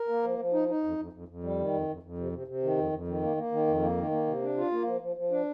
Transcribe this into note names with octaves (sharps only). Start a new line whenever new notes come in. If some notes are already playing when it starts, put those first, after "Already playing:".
Already playing: A#4
A#3
F3
F3
D#4
D#4
F2
F2
F2
F2
G3
D#3
F2
F2
F2
C3
C3
C3
D#3
F2
F2
D#3
A#3
A#3
D#3
F2
A#3
D#3
A#3
C3
D4
F4
A#3
F3
F3
F3
D4